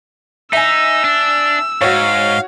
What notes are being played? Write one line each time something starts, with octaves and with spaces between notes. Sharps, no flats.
D#4 E5 G#5 E6
D4
G#2 F#4 C#5 F5